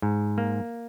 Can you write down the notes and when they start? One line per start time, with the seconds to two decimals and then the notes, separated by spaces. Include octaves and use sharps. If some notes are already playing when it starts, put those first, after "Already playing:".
0.02 G#2
0.38 A#3